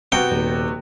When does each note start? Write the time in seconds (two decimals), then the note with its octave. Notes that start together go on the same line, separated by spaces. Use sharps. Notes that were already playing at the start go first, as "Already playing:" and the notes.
0.12 C3 B3 F#4 G5 C#7
0.31 D#1